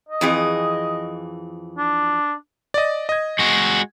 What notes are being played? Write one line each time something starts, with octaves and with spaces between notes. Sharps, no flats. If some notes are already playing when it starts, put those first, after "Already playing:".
D#5
F2 E3 G#4
D4
D5 D#5
D#5 G#6
G#3 F#4